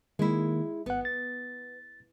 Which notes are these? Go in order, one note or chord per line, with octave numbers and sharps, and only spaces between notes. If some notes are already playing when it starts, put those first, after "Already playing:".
D#3 G#3 A#3 E4
G#1 B3 F#5
A6